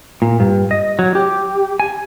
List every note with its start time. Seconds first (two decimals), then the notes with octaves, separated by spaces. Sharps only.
0.22 A#2
0.40 G2
0.71 D#5
0.99 F#3
1.15 G4
1.80 G#5